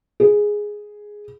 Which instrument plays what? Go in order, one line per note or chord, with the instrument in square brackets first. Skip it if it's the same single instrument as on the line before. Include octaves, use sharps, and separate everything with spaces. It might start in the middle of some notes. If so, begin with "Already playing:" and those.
[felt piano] G#4